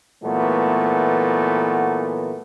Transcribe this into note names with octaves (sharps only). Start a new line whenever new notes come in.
A#2 E3 F#3 A3 B3